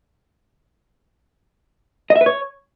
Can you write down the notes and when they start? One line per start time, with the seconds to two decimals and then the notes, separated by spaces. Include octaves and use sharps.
2.10 D#5
2.16 E5
2.21 B4
2.26 C#5